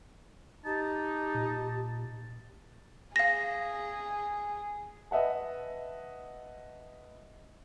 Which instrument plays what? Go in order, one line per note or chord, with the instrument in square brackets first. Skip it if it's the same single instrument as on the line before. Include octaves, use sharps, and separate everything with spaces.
[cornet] D#4 [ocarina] G4 [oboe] A5
[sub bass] A#2
[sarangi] G#4 [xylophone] F5 A#6
[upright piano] B4 D#5 E5 F#5 A5